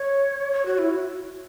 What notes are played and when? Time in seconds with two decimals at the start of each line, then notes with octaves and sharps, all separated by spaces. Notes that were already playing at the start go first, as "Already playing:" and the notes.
Already playing: C#5
0.53 C#5
0.66 F#4
0.78 E4
0.90 F#4